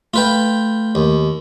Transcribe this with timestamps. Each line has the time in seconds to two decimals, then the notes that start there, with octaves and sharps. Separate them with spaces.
0.14 A3 F4 B4 G5
0.95 D#2